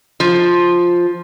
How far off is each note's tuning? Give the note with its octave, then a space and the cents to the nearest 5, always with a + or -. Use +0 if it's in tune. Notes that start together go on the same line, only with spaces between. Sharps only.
F3 +5